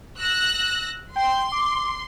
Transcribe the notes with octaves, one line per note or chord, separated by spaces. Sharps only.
E6 F#6 A#6
G5 C6
D6